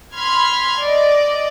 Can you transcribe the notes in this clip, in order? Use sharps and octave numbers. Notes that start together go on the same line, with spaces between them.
B5 C6 F6 G#6
D5 D#5